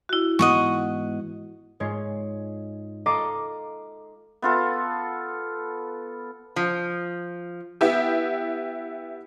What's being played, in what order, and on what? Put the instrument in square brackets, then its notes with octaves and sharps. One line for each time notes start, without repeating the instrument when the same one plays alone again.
[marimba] E4 F#4
[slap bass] G#2 E3 B3 [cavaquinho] D#5 F#5 C#6
[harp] G#2 G#3 F4 C#5
A4 D#5 F5 A#5 C6 D6
[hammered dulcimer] B3 F4 A4
[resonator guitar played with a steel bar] F3
[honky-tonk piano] B3 E4 G4